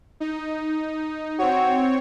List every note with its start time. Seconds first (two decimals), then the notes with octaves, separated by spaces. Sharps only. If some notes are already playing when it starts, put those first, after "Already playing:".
0.20 D#4
1.39 C4 F#4 C#5